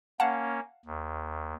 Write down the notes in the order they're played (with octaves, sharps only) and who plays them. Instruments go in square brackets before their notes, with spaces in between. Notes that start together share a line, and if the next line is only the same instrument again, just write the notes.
[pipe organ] A#3 C#4 [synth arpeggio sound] F5 F#5 A5
[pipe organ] D#2